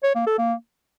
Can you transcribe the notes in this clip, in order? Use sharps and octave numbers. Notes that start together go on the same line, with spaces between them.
C#5
A#3
A4
A#3